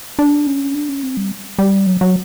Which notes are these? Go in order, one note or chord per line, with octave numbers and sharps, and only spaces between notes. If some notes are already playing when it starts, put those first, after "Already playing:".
D4
C#4
D4
C#4
C4
G3
G3
F#3
F#3